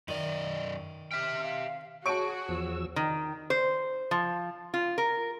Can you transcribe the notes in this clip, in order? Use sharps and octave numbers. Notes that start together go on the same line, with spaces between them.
F#2 D#3 D5 D#5
G4 E5 G5 F6
F5
F#4 G#4 C#5 A5 C#6 D7
E2 F3 E6
D#3
C5
F3
F4
A#4